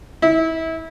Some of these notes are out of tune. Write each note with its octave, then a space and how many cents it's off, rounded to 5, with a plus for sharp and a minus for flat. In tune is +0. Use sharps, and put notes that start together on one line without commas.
E4 -25